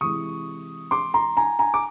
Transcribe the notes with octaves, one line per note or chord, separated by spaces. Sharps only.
C3 E3 G#3 C#6 D#6
C6 D6
A#5 C6
G#5 A#5
G#5 A#5
D6